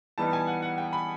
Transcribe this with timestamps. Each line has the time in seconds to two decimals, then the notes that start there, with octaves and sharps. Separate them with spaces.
0.18 E3 G3 B3 D#4 A5
0.33 G#5
0.47 F#5
0.62 F#5
0.78 G5
0.93 B5